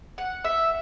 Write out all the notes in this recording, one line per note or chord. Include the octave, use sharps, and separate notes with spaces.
F#5
E5